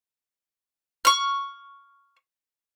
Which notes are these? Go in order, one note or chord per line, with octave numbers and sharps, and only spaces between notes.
C#6 F6